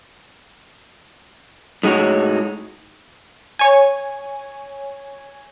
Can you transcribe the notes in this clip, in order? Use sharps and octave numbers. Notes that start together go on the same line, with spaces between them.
A2 G#3 D#4 F#4 C#5
C#5 G#5